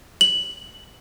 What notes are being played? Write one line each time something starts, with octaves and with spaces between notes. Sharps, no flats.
F#7